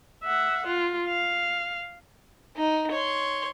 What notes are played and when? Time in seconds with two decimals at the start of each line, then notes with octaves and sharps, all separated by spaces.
0.24 E5 F#5
0.66 F4
1.08 F5
2.57 D#4
2.92 C#5 C6